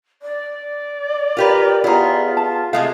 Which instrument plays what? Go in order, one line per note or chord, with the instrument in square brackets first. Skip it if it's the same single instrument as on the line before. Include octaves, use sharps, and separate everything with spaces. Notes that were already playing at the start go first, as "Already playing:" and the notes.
[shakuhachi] D5
[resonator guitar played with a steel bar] F4 G4 B4 [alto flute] A#4
[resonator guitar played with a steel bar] B3 G#4 [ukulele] E4 G4 A#5 [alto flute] F4
[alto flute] F4 [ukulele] A5
[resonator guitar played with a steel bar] C3 G#3 A3 [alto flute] G#4 [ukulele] F5